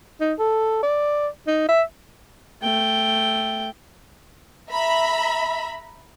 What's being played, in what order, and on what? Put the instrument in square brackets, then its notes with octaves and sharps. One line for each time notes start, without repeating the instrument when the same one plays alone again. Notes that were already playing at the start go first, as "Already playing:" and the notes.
[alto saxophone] D#4
A4
D5
D#4
E5
[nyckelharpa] A3 G5
[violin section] E5 A#5 B5